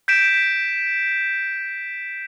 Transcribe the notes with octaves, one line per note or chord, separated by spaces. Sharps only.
G6 B6 D7 E7